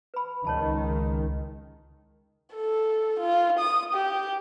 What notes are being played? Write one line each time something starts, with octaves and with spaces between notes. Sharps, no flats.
B4 B5
C#2 D#3 C#5 A5 B5
A4
F4
D#6
G4